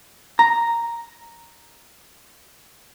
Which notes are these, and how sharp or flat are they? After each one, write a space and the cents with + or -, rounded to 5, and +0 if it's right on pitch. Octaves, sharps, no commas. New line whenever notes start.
A#5 -5